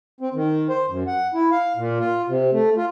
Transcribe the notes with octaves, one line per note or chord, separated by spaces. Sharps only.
C4
D#3
C5
F#2
F#5
E4
F5
A#2
F4
C3
A3
F4